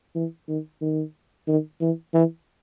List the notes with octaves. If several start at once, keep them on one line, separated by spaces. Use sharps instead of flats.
E3
D#3
D#3
D#3
E3
E3